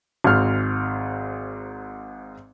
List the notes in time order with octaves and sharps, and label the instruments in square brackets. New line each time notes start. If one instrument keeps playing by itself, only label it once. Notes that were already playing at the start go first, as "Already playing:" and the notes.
[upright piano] G#1 G#2 F6